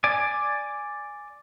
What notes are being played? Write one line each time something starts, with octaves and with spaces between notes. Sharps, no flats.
D5 G#5 D6